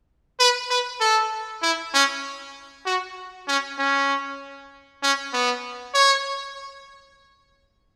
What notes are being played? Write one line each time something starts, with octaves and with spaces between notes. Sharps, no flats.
B4
B4
A4
E4
C#4
F#4
C#4
C#4
C#4
B3
C#5